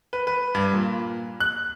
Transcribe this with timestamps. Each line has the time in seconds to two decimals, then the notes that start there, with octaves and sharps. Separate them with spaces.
0.13 B4
0.27 B4
0.55 G2
0.73 A#2
1.40 F#6